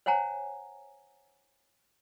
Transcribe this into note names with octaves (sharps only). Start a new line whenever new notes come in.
C5 C#5 F#5 G#5 A#5